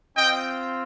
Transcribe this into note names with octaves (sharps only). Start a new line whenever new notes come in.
C4 F4 D#5 G5